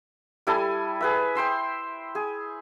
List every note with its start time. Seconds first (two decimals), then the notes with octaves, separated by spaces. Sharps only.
0.47 G3 E4 A4 G#5
1.01 G#4 B4 E5
1.35 C5 G5 C6 E6
2.15 G#4